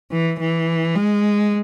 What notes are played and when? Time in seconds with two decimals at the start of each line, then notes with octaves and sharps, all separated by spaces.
0.12 E3
0.40 E3
0.96 G#3